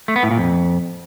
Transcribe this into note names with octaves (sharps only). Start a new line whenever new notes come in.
A3
B3
A2
A#2
F2